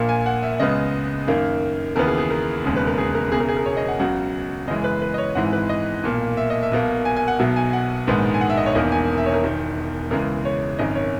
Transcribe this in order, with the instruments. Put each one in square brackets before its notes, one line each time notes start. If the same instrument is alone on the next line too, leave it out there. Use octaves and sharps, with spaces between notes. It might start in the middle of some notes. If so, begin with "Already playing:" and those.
Already playing: [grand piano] A#1 A#2 A#3
G#5
F#5
E5
C#2 C#3 G#3 B3 D#5
F#2 D#3 A#3
D#2 C#3 E3 B3 A#4
G#4
G#4
A#4
E1 D#2 C#3 G#3
B4
A#4
G#4
A#4
E1 E2 C#3 G#4
A#4
G#4
A#4
C#5
D#5
F#5
C#2 C#3 F#3 F#5
F#2 C#3 E3 G#3 D#5
B4
B4
D#5
C#5
G#1 G#2 E3 G#3 F#5
B4
D#5
B1 A#2 A#3
E5
D#5
E5
B1 B2 A#3
G#5
G#5
F#5
B1 B2 F#3 E5
G#5
F#5
A#1 G#2 D#3 G#3 B3
G#5
F#5
E5
D#5
C#5
E1 E2 D#3 A#3 D#5
G#5
E5
C#5
A#4
E1 E2 D#3
C#2 C#3 E3 G#3 A#4
C#5
G#1 F#2 D#3 D#5
C#5